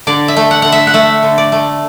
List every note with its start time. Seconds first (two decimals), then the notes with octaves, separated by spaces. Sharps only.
0.07 D3 D5
0.28 E5
0.37 A3
0.51 F#5
0.62 D3 F#5
0.72 E5
0.87 F#5
0.94 A3 E5
1.23 D3
1.38 D5
1.52 A3